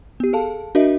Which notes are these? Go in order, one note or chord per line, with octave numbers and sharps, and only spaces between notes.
B3 G4
G#4 A4 F5 A5
D4 F#4 A#4 D#5 E5